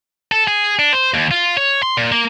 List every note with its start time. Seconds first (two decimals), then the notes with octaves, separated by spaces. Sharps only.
0.32 A4
0.48 G#4
0.79 D4
0.93 C5
1.14 D#2
1.31 F4
1.57 C#5
1.83 C6
1.97 A#2
2.12 A#3